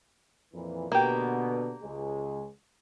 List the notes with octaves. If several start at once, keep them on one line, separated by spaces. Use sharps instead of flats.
F2 A#2 E3
B2 D3 A#3 B3 G4
C#2 G#3